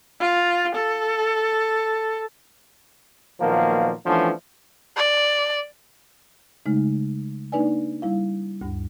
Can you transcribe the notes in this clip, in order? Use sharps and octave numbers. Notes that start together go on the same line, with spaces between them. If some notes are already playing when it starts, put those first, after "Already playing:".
F4
A4
A#2 D#3 F3 F#3 A#3 B3
E3 F3 A3 B3 C#4 D4
D5
C#3 G#3 A3 D#4
A#3 D4 D#4 B4 D5 G#5
G3 E4 F5
D2 G2